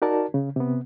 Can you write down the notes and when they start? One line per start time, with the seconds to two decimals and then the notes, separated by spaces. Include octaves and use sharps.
0.02 D#4 F#4 A#4 D5 A5
0.34 C#3
0.56 C3 B3